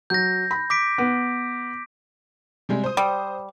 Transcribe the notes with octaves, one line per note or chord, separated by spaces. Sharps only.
F#3 G6 A#6
B5
D6 B6 D7
B3
C3 G3 G#3
C5 D#6
G3